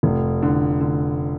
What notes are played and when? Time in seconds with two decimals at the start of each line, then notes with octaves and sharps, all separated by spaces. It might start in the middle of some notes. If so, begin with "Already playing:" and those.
0.03 F1
0.42 D3
0.81 D3